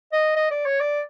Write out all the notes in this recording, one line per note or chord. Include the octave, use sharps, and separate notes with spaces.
D#5
D#5
D5
C#5
D5